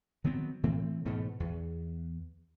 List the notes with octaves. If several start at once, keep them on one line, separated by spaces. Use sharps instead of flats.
D#3 F#3 B3 C4
A2 E3 A3 C4
G#2 B2 E3 A3
E2